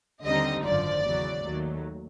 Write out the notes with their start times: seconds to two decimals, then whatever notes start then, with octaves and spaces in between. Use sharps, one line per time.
0.24 D#2 D3 G3 C4 D#4 D#5
0.64 G#1 F#2 D3 F3 D5
1.05 E2 C#3 F#3
1.45 D#2 D#3 F#3 A3